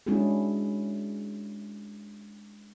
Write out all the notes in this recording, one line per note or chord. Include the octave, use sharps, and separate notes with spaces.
G#3 C#4 D4 E4 F#4 G#4